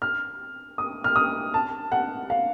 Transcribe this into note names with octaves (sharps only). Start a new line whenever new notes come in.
F6
D#6
F6
D#6
A5
F#5
F5